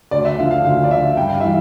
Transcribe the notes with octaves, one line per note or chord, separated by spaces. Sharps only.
D2 D5
E5
D3 F3 F5
F5
D2 F5
D5
D3 F3 E5
G2 G5
F5
E3 G3 E5